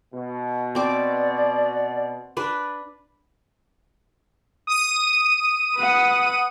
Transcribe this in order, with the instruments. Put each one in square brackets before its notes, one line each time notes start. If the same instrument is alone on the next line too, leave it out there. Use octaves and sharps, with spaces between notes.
[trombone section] B2
[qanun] C4 D6 [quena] D5
[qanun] D4 B4
[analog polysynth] D#6 D#7
[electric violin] B4 F#5